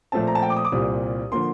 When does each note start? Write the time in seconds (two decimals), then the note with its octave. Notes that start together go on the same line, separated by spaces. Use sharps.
0.12 A#2 F3 A3 C4 A5
0.27 A#5
0.35 A5
0.42 G5
0.50 D6
0.57 D#6
0.65 D6
0.72 C2 A#2 G3 C4 D#6
1.32 D3 F3 A#3 C6